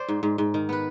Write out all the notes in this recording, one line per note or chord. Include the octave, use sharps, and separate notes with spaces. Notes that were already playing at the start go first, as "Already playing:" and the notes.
Already playing: C5 D5
G#2
G#2
G#2
D#3
B3 B4